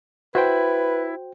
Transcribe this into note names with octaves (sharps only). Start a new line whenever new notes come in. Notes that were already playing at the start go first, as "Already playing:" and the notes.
E4 F#4 B4 C5 G5